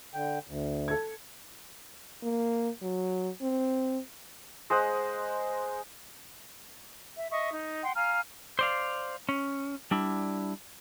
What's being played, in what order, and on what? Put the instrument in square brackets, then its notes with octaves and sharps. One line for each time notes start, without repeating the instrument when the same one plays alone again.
[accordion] D3 G5
D2
[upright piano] A4 G#6
[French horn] A#3
F#3
C4
[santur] G#3 C5 D#5 F#5
[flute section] E5
D#5 E5 C#6 D#6
D#4
F#5 G5 C6
F5 G#5 A#5 F6
[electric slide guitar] C5 D5 F5
C#4
G3 D4 E4